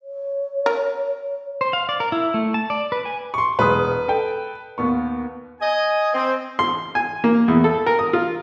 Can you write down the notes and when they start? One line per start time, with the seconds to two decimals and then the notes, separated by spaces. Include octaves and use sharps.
0.02 C#5
0.66 A#4
1.61 C5
1.73 F5
1.89 D5
2.00 A#4
2.12 E4
2.34 A3
2.54 A5
2.70 D5
2.92 B4
3.05 G#5
3.34 C6 C#6
3.59 E1 G#3 B4 D#6
4.08 A4 G5
4.78 D#2 B3 C#6
5.61 D#5 G#5
6.14 C4
6.59 C6
6.95 G#5
7.24 A#3
7.48 E2
7.64 A4
7.86 A#4
7.99 D#6
8.13 F4